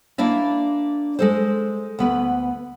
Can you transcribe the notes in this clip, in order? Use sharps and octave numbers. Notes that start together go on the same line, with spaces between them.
A#3 D4 E4 D5 E5
G#3 A4 C5
D2 B3 B4